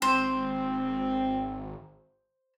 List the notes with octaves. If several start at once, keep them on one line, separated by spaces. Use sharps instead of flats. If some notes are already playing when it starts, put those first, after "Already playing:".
G#1 C4 C5